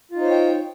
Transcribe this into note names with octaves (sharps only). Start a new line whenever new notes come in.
D#4 F4 C5 C#5 G5